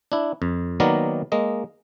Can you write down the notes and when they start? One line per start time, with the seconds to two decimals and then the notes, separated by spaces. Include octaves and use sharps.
0.12 D4 E4
0.42 F2
0.80 D#3 F#3 A#3 B3 A#4 D5
1.32 G#3 A#3 D#5